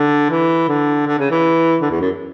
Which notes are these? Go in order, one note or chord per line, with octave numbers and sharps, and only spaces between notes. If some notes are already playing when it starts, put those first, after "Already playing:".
Already playing: D3
E3
D3
D3
C#3
E3
D3
E2
F#2